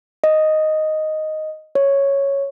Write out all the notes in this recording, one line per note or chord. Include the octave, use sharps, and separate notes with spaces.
D#5
C#5